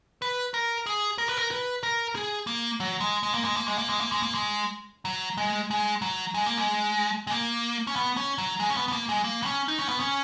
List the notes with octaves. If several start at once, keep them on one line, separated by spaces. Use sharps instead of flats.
B4
A#4
G#4
A#4
B4
A#4
B4
A#4
G#4
A#3
F#3
G#3
G#3
A#3
G#3
A#3
G#3
A#3
G#3
A#3
G#3
A#3
G#3
F#3
G#3
G#3
F#3
G#3
A#3
G#3
G#3
A#3
C#4
B3
C#4
F#3
G#3
C#4
B3
B3
A#3
G#3
A#3
B3
C#4
D#4
C#4
B3
C#4